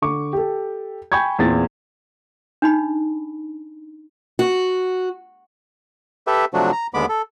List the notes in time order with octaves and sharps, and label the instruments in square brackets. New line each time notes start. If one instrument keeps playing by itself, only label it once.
[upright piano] D3 C#6 D6
G4 A4
G5 G#5 B5 C#6 G6 G#6
E2 A#2 C4 G#4 A6
[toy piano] D4 D#4 B5
[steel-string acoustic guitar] F#4
[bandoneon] G4 A4 B4 E5
C3 F3 F#3 A3 D4 F#4
A#5
D#2 D3 G#3 B3 B5 D6
A4